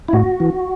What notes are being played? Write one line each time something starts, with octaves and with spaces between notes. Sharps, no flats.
E4
A2 F#4
E3